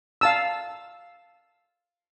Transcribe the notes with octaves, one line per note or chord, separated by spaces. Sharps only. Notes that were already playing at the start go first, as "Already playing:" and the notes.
F5 A5 E6